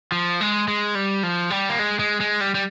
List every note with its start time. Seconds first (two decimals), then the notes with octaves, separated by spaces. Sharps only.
0.12 F3
0.41 G#3
0.68 G#3
0.95 G3
1.23 F3
1.50 G3
1.69 A#3
1.79 G#3
1.99 G#3
2.20 G#3
2.41 G3
2.55 G3